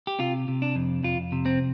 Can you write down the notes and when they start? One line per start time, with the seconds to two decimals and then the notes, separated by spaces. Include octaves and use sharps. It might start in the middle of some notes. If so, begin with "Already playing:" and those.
0.07 G4
0.19 C3 F4
0.48 C3
0.62 D4
0.76 F2
1.04 F2 F4
1.32 C3
1.46 C4